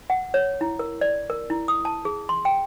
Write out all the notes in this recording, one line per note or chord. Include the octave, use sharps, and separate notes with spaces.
F#5
C#5
E4
A#4
D5
A#4
E4
D#6
A5
G#4
C6
G5